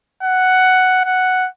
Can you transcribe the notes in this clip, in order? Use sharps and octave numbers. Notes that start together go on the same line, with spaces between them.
F#5
F#5